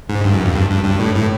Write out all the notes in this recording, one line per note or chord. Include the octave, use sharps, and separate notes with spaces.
G#2
G2
F#2
F2
G2
G2
G2
A2
A2